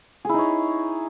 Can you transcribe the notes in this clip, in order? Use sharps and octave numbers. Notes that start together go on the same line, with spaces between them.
D#4 E4 G#4 C#5